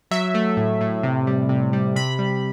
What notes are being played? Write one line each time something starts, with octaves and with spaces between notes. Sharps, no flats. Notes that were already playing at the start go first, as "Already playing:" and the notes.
F#3 E5
A3
A2
A2
C3
G3
C3
G3
C3 B5
G3